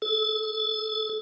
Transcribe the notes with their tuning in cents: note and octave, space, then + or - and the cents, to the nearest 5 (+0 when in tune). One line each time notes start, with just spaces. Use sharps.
A4 -30